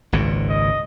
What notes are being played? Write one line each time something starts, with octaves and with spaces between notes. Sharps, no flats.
G#1 C#2 A#2
D#5